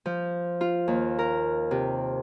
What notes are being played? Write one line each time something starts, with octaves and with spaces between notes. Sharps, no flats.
F3
F4
D#2
A#4
C3